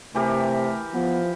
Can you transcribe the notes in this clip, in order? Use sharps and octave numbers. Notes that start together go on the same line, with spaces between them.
C3 E3 A3 G4 A#4
F3 B3